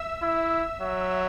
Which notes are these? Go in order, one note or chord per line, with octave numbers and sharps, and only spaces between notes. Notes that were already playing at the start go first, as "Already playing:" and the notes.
Already playing: E5 E6
E4
F#3